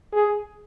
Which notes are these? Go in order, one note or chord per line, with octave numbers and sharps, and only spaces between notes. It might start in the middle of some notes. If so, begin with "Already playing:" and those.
G#4